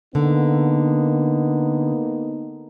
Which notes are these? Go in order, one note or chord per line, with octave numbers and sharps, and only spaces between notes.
D3 A#3 B3 D#4